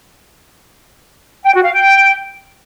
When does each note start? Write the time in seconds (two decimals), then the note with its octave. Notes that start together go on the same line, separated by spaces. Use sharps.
1.43 G5
1.53 F#4
1.64 F5
1.74 G5